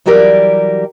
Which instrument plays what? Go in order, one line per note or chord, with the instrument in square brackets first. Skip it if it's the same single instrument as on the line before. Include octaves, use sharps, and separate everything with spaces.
[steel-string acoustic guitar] E3 F#3 G3 G4 A#4 D5